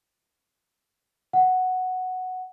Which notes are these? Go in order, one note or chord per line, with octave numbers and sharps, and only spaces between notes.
F#5